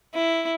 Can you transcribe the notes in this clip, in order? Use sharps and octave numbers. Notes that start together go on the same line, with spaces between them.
E4